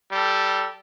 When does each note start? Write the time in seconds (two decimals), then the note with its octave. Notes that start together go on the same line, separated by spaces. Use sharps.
0.12 G3 A4